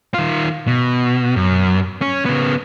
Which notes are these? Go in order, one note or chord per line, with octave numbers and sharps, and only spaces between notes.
D#3 F4
B2
F#2
C#4
C#3 B3